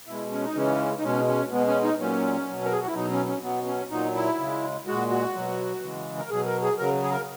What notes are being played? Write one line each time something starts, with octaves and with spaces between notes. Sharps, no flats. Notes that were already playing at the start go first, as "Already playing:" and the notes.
B2 G#3 E4
C#4
D#4
C#3 E3 G#3 C#4
D#4
B2 G#3 C#4
C#4
B2 G#3 B3
C#4
D#4
A#2 F#3 C#4
B2 F#3
A#4
G#4
F#4
E4
B2 F#3 D#4
C#4
C#4
B2 F#3 B3
C#4
A#2 F#3 D#4
E4
C#3 G#3
A#2 G#3 F#4
F#4
B2 F#3
C#3 E3 G#3
A#4
B2 F#3 G#4
A#4
G#4
C#3 F#3 A#4
G#4
A#4